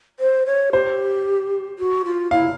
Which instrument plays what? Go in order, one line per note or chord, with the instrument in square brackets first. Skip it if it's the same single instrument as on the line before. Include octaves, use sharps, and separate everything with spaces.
[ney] C5
C#5
[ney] G4 [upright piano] C5
[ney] F#4
F4
[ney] E4 [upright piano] F5